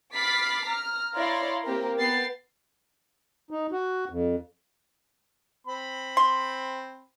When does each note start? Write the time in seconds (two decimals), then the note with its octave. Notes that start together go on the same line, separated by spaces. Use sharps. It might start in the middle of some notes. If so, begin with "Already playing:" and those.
0.14 B5 D6 F6 A6 B6 C7
0.67 A#5 F6
1.16 E4 C#5 D5 F5 A#5 C6
1.64 A#3 C4 G4 A#4
1.99 B3 G5 A6 C7
3.51 D#4
3.72 F#4
4.10 F2
5.67 C4 B5
6.17 C6